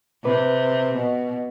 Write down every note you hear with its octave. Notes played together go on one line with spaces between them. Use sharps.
C3 B4
B2